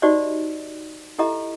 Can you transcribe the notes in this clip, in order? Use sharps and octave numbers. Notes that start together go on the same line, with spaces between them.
D#4 F#4 G4 C5 D5 D#5
E4 G4 A4 D#5 E5 A#5